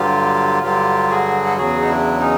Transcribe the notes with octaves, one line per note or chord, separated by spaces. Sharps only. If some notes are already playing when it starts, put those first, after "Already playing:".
Already playing: G2 D3 F#3 F4 G4
G2 D3 F#3 F4 G4
F#4 G#4
A4
E2 C#3 F#3 F#4 G#4
D#4
D4 E4
C#4 D#4